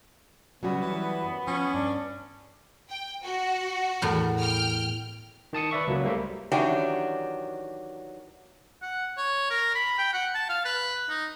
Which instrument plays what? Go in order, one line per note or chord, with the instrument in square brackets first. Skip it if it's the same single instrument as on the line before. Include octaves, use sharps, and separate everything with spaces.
[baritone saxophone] C#3 [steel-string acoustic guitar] F#3 G3 F#4 [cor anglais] B3
[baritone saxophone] E3
[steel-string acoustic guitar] F#2
[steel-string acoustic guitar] F3 [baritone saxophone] C#4
[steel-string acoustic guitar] G2 [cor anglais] D4
[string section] G5
F#4
[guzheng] E2 A2 A#4
[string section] G5 F6
[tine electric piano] D#3 A5 D#6 C#7
B4 D5 E5 C#6
C#2 F#3 A#3
G3 A3 A#3 C5 E5
[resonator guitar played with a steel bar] D#3 E3 F#3 C#4 D4 G4
[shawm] F#5
C#5
A#4
B5
G5
F#5
A5
F5
B4
D#4